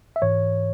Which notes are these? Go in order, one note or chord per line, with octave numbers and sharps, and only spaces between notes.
E5
G#2 E3 C#5